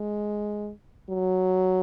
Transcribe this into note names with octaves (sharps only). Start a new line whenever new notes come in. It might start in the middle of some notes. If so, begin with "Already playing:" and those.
Already playing: G#3
F#3